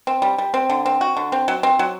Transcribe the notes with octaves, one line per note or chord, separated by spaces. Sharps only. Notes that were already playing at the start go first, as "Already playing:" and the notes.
C4
G3
G3
C4
D3
C4
F#4
D3
C4
F#3
C4
F#3